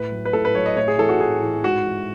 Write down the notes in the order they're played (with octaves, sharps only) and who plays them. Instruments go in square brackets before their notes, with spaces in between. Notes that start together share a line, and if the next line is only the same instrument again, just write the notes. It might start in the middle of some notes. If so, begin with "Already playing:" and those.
Already playing: [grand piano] A2 B4
F#3
B4
A2 A4
B4
F#3 C#5
D#5
A2 C#5
G#4
E3 A4
F#4
A2 G#4
E3
G#2 F#4
E3